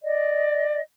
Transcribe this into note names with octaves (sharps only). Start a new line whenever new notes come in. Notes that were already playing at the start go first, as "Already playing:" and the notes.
D5 D#5